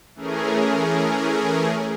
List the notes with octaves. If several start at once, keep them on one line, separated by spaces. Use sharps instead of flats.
E3 A3 C#4 G#4 A#4